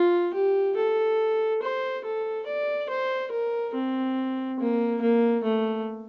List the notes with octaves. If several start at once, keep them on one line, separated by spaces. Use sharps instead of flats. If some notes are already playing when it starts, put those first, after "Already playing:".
Already playing: F4
G4
A4
C5
A4
D5
C5
A#4
C4
A#3
A#3
A3